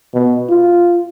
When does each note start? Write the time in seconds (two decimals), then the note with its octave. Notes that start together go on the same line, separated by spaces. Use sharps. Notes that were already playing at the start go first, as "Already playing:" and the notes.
0.14 B2
0.49 F4